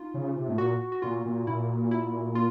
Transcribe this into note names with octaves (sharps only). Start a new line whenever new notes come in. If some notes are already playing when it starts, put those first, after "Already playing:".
Already playing: D#4 F4
C#3
C3
A2
A#2 F#4
F#4
A#2 F4
A#2
A#2 E4
E4
F4